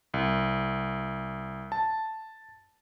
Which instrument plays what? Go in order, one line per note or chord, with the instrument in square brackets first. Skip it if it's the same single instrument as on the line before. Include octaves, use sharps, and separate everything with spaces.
[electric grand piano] C2
A5